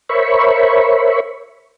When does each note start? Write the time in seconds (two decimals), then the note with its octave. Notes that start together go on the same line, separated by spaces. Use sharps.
0.09 A#4 C5 C#5 E5 B5 C#6